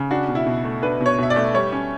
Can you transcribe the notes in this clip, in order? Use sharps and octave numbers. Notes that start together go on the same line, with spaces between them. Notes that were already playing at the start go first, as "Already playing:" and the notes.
Already playing: C#3
D4 F#4
B2
E4
B2
A3
D4 B4
B2
C#5
B2 E5
D5
A3
G3 C#5
C#4